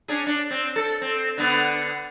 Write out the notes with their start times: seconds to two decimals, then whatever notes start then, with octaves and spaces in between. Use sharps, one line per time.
0.08 C#4 D4 G#4
0.27 D4
0.51 C4
0.76 A4
1.02 C4
1.38 D3 B3